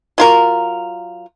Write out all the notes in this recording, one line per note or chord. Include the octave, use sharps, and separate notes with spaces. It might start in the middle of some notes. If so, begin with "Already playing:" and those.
F#3 F4 A#4